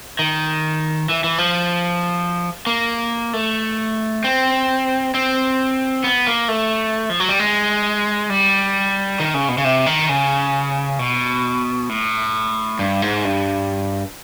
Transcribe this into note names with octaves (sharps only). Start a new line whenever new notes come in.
D#3
E3
E3
F3
A#3
A3
C4
C4
B3
A#3
A3
F3
F#3
G3
G#3
G3
D#3
C#3
B2
C#3
C3
D#3
C#3
B2
A2
G2
G#2
G2